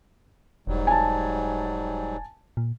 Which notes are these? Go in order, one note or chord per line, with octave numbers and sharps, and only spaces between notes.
E1 G#2 F#3 G3
G#5 A5
A#2